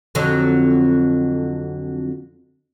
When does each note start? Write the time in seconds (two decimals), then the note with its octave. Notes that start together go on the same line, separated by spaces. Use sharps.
0.15 F2 D3 F#3